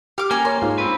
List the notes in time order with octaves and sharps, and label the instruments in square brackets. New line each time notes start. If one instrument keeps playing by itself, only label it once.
[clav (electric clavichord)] G4 [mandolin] F5 D6
[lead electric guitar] A#3 [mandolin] C#4 G#5
[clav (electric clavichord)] A#4 C#5 [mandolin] C6
[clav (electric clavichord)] G#2 F4
[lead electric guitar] C4 B4